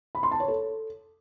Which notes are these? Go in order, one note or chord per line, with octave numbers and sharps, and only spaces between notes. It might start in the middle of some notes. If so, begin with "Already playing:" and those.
B5
C6
A5
C#5
A4